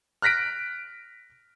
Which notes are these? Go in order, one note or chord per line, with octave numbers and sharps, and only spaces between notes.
F6 F#6 A#6 B6 D7